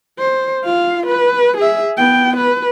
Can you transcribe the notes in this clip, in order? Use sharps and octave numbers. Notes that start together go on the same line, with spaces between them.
C5
F4 F5
B4
G#4 E5
B3 G5
B4